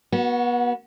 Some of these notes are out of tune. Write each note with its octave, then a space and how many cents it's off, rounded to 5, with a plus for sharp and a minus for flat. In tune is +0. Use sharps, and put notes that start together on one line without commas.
B3 -35 F#4 +0